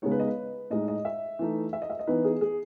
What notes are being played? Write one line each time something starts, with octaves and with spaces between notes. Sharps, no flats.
C#3 G#3 B3 D#4 C#5
B4
D#5
B4
A2 G#3 D#4 D#5
D#5
E5
E3 A3 D#4
E5
D#5
E5
D#5
E3 B3 D#4 B4
G#4
G#4